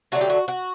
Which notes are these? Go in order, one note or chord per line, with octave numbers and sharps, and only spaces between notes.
D3 F#3 A3 F#4
G4
F#4
F#4